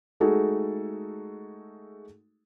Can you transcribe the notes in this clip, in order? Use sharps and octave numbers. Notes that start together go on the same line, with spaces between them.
G#3 A3 D#4 F#4 G#4 A4